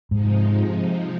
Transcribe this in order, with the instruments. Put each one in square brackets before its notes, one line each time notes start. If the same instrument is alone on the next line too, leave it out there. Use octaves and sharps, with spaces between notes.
[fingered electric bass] G#2 [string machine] C3 F3 G#3 D#4